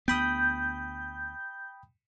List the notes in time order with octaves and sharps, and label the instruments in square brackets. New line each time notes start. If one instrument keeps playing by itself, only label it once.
[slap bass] D2 B3 [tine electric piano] G5 B5 D#6 [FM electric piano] G6